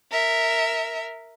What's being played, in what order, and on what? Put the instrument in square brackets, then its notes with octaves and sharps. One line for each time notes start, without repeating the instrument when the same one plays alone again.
[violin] A#4 E5